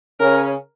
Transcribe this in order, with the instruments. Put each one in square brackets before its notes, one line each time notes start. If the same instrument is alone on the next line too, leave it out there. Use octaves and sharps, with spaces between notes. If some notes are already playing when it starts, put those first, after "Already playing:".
[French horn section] C#3 C#4 [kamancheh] A#4